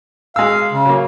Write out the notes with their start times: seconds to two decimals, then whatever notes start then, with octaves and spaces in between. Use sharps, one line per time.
0.36 G#3 F5 E6
0.72 C#3
0.85 F#3 A#3